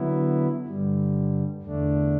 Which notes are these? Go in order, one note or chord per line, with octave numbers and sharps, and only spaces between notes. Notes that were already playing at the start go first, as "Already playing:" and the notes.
Already playing: D3 F#3 B3 E4
G2 D3 G3
E2 D3 A3 D4